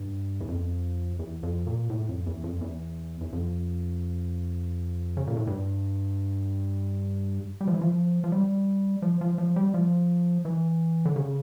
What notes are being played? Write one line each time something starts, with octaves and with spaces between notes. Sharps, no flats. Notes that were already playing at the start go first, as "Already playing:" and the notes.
Already playing: G2
E2
F2
E2
F2
A#2
A2
F2
E2
F2
E2
E2
F2
C#3
A#2
A2
G2
G3
F3
E3
F3
F3
G3
F3
F3
F3
G3
F3
E3
D3
C#3